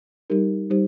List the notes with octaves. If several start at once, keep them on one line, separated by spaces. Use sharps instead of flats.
G3 D#4 G4 A#4
G3 D#4 G4 C5